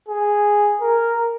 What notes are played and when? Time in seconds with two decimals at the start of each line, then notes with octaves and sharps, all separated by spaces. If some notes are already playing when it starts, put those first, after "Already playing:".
0.09 G#4
0.81 A#4